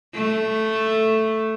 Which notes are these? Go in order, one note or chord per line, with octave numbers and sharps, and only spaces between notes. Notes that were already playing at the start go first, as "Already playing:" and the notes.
A3